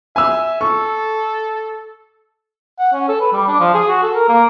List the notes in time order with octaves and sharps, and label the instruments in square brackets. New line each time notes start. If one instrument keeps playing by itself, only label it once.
[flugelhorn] E5 [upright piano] G#5 E6
[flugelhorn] A4 [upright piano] C#6
[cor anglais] F#5
C#4
A4
B4
G3
D4
F3
G#4
F#4
A4
A#4
A#3